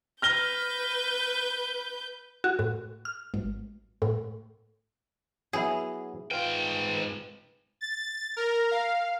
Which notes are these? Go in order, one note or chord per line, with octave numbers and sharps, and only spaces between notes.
B4 F6 G6 A#6 G7
F#4
A2
F6
G#1
A2
F#3 B3 E4 G#4
G#2 F4 B4 F5 G5
A6
A#4
F5